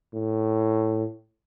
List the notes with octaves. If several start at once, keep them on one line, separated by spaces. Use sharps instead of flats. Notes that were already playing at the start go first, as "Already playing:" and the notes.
A2